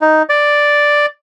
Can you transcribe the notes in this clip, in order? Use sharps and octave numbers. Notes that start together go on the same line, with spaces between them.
D#4
D5